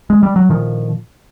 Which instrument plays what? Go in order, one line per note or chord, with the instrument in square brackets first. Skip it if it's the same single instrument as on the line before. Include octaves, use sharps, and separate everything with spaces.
[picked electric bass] G#3
G3
F#3
A#2 D#3 F3